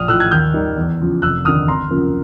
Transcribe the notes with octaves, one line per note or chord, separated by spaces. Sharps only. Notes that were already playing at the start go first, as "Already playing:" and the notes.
Already playing: A#1 D#6 F6
A2 F3 E6 F#6
F#6 G#6
D#2 F6 G6
D#3 G3
E2
C#3 F3
F1 E6 F#6
D#2 D3 D#6 F6
G#1 A#5 C6
F#2 C#3 F3 A#3